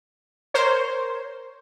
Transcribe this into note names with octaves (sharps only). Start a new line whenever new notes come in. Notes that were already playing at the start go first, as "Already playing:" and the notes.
A#4 C5 C#5